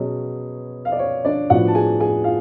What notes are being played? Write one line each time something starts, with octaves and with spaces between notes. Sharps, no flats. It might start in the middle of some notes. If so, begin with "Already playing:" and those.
Already playing: B2 F#3 C#4 G#4
F5
D5
C#5
D4 D5
A2 F3 B3 D4 F#4 F#5
A5
G#4 G#5
G#4 G#5
F4 F5